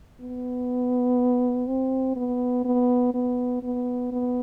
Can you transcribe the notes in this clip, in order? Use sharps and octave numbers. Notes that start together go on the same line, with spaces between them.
B3
C4
B3
B3
B3
B3
B3